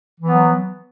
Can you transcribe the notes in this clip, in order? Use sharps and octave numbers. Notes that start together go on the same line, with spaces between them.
E3 F#3 B3